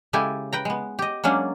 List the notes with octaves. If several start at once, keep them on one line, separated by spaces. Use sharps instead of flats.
C#3 G#3 E4 G4 A4 G#5
B4 G5 A#5
G#3 B3
G4 D#5
F#3 G#3 A#3 C#4 D4